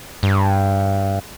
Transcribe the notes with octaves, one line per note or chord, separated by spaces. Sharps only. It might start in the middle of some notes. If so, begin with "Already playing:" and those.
G2